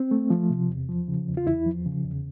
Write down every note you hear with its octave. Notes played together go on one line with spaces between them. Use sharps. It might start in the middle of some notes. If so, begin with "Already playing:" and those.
Already playing: C4
A3
F3
C3
E2
F3
C#3
E2
F4
E2 E4
F3
C#3
E2